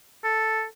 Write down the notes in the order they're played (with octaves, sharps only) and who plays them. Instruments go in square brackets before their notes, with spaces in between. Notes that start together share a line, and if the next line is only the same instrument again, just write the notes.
[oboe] A4